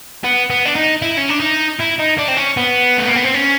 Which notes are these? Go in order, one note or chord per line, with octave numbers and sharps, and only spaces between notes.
B3
B3
D4
D#4
E4
C#4
D4
D#4
E4
D#4
D4
C4
C#4
B3
A3
A#3
B3
C4
C#4